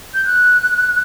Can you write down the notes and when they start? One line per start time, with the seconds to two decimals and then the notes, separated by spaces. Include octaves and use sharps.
0.14 G6
0.25 F#6